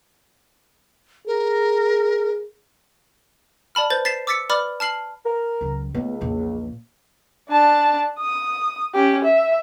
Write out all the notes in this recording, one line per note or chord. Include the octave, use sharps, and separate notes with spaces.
G#4 A#4
D5 A5 B5 F6
B4 C5 G6 A6
A6 B6 C7 E7
D6 E6 A6 B6 C#7
B4 D5 B5 D6 F6 A6
A5 F6 C7 F#7
A#4
C#2 F#3
C#2 A3 B3
A#1 E2
D4 A5
D#6
C#4 G4
E5